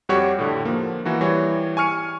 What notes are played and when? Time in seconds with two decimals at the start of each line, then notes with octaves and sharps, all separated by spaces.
0.09 F2 G3 F#4 G4 C#5 C#6
0.39 A2 D3
0.65 F3 A#3
1.05 E3 A#3 F#4
1.21 E3 G3 C#5
1.77 G#5 C#6 F6 C#7 D#7